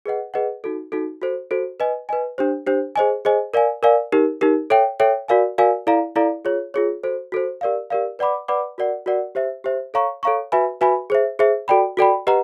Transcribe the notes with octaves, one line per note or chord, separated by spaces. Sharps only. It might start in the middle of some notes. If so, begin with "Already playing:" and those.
G#4 B4 D#5 F#5
G#4 B4 D#5 F#5
D#4 F#4 A4
D#4 F#4 A4
F#4 A4 C5
F#4 A4 C5
B4 D#5 G#5
B4 D#5 G#5
D4 G4 C5
D4 G4 C5
G#4 C5 D#5 G#5
G#4 C5 D#5 G#5
A#4 D5 F5 G#5
A#4 D5 F5 G#5
D#4 G4 A#4
D#4 G4 A#4
A4 C#5 E5 G5
A4 C#5 E5 G5
F#4 A#4 D5 F5 G#5
F#4 A#4 D5 F5 G#5
E4 A4 D5 F5 A#5
E4 A4 D5 F5 A#5
F4 G#4 C#5
F4 G#4 C#5
F#4 A4 C5
F#4 A4 C5
G4 A#4 D5 F5
G4 A#4 D5 F5
B4 D5 F#5 B5 D6
B4 D5 F#5 B5 D6
F#4 A#4 D5 F#5
F#4 A#4 D5 F#5
G4 C5 E5
G4 C5 E5
A4 C#5 F5 A#5 C#6
A4 C#5 F5 A#5 C#6
F#4 B4 E5 G#5 B5
F#4 B4 E5 G#5 B5
G#4 C5 E5
G#4 C5 E5
F#4 A4 D5 G5 B5
F#4 A4 D5 G5 B5
G4 B4 D#5 F#5 A#5